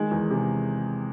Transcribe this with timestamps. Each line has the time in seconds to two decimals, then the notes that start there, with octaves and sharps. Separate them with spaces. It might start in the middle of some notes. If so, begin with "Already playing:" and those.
Already playing: D#3 G#3
0.11 E2
0.30 C3